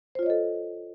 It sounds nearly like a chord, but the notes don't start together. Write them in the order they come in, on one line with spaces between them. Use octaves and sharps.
C5 F4 C#5 D#5 A4